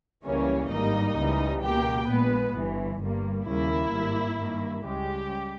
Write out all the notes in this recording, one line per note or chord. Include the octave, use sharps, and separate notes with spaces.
C#2 C#3 E3 G3 A#3 C#4 C#5
G#1 G2 G3 A#3 D#4 D#5
C#2 C#3 E3 G3
C#2 B2 A#3 G4 G5
A#1 A#2 G#3 B3 B4
G1 G2 E3
G1 G2 G3 A#3
D#2 C#3 G3 A#3 E4
G#1 G2 G3 A#3
G2 D#3 A#3
C#2 C#3 G3 G#3 G4